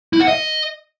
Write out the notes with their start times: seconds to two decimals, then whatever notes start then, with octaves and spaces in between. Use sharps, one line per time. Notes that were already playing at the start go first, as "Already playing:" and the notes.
0.13 E4
0.21 F#5
0.28 D#5